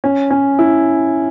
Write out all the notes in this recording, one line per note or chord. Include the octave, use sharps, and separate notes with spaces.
C#4
C#4
E4